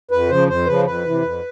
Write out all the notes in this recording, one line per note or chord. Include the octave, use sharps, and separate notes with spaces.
F2 B4
C#3 F3 C5
F2 C5
C#3 F3 B4
F2 B4
C3 E3
F2